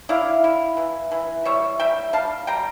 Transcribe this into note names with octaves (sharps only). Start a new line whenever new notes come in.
E4 D5 F5
E4
E3
E3
G3 C#5 E5
G3 E5 G5
G3 F5 A5
G3 G5 A#5